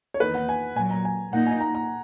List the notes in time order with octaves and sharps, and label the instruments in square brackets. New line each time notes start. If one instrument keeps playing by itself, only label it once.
[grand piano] C#5
[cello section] E2 D#3 A#3 D#4 [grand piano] B4
[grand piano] F#5
G#5
[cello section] A#2 F#3 A#3 [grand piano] G#5
[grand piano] A#5
G#5
[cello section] A#2 A#3 D#4 [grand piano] F#5
[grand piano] G#5
A#5
A#5